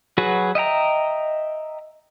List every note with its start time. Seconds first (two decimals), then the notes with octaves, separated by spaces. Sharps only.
0.18 F#3 F#4 G#4 B4
0.55 D#5 E5 G5 A#5